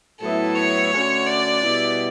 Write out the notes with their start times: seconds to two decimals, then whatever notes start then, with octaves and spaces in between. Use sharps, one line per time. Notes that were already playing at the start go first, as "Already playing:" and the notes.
0.20 A2 F#3 B3 E4 A4
0.56 C#5
0.91 D3 A3 C#4 F#4
1.27 D5
1.62 B2 G3 B3 E4